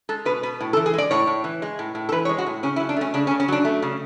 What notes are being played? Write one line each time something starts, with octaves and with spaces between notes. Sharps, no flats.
G#3 A4
B2 B4
B2 B4
A2
A4
E3
G#4
G#3 D5
A2 C#5
A2
E3
G#3
A2
A2
A4
E3 B4
C#5
G#3
F#4
A2
C#3 C#4
E4
F#3
D4
A3 C#4
C#3 D4
C#4
C#3
C#4
F#3 D4
A3
C#3